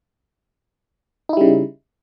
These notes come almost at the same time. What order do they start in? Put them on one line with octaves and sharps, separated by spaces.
D#4 E4 G3 C#3